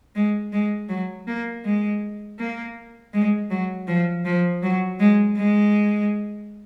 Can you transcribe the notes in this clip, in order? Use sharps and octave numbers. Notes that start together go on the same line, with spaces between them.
G#3
G#3
F#3
A#3
G#3
A#3
G#3
F#3
F3
F3
F#3
G#3
G#3